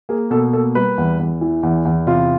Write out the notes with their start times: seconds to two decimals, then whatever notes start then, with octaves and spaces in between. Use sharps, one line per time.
0.09 A#3 G#4
0.31 B2 A4
0.53 A#3 A4
0.75 G3 B4
0.98 E2
1.19 E2
1.41 E3
1.63 E2
1.85 E2
2.07 C3 F4